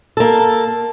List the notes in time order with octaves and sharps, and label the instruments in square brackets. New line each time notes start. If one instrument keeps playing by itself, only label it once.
[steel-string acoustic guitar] A#3 A4